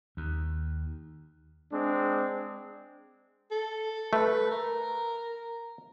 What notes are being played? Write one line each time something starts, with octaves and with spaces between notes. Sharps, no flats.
D#2
G#3 C4 D4
A4
A3 B4
A#4